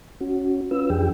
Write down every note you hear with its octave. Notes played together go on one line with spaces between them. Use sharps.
C#4 F#4
C#4 F4 B4 E6
F2 F3 D4 G4 G#4 G5